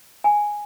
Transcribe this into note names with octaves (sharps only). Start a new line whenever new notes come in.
G#5